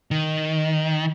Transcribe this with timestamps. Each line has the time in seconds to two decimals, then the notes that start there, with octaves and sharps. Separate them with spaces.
0.11 D#3